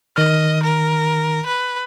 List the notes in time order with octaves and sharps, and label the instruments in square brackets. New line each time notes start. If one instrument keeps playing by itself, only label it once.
[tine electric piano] D#3 F6 [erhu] D#5
[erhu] A#4
B4